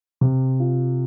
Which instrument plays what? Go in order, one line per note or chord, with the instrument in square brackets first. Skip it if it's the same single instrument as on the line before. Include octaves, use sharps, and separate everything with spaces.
[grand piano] C3
F4